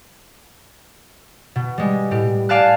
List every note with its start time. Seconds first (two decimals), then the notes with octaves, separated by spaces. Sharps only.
1.56 B2
1.78 G3 G#3
2.11 A2 G4
2.49 D5 F5 G#5 A5 F#6